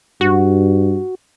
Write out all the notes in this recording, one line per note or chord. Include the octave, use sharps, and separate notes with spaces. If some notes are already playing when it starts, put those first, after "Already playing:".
G2 F#4